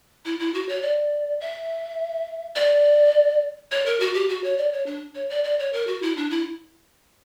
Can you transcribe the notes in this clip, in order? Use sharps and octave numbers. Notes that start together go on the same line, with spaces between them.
E4
E4
F#4
C#5
D5
E5
D5
C#5
A#4
F#4
G4
F#4
C#5
D5
C#5
D4
C#5
D5
D5
C#5
A#4
F#4
E4
D4
E4